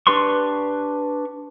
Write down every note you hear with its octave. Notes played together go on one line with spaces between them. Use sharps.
D4 G4 B4 C6 C#6